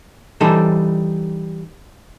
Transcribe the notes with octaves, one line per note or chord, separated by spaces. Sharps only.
E3 G3 D#4 A4 C5